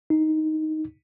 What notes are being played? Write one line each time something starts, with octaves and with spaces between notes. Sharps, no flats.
D#4